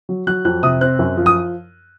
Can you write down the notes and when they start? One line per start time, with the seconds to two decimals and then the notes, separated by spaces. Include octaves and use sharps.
0.09 F#3
0.27 F#3 F#6
0.45 F2 F#6
0.63 C3 D#6
0.81 C4 F#6
0.99 F#2
1.17 F3
1.26 D#6